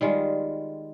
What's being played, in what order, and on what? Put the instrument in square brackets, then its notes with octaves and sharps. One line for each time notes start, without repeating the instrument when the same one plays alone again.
[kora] D#3 G3 G#3 F4